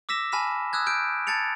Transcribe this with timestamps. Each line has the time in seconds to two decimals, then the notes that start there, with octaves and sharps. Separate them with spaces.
0.09 D6 E6 A#6 B6 E7
0.32 G#5 A5 B5 F6 B6 E7
0.73 D#6 E6 F#6 G#6
0.86 F6 G6 D7
1.27 A5 G#6 A6 C#7 F7